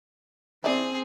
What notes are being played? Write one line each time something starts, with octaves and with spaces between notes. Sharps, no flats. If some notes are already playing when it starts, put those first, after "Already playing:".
C4 E4 G#4 D5